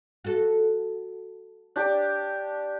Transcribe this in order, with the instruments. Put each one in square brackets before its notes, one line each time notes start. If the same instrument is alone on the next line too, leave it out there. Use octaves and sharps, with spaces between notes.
[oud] F#4 A4
[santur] D4 G4 D5